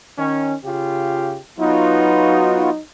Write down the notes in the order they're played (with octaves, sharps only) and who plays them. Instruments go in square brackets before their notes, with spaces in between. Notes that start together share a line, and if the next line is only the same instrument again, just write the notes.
[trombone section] D#3 C#4
C#3 F4 G4
[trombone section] F#3 D#4 [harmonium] B3 F4 F#4